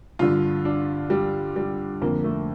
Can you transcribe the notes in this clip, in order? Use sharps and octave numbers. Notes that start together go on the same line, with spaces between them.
G2 D3 F4
D4
G3
G3
F2 D3 A#3
A3